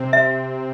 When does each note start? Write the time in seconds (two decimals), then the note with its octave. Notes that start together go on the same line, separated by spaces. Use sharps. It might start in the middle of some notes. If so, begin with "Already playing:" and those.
Already playing: C3 C4
0.13 E5